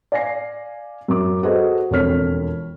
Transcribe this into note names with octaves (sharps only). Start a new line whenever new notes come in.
D5 F5 G#5 A#6 C7
F#2 D6
F#4 G#4 A4 B4 C5 D#5
E1 F2 A4 C#5 F6 B6